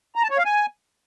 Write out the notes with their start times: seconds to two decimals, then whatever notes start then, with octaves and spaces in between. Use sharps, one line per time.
0.15 A#5
0.23 A5
0.30 C#5
0.38 F5
0.45 G#5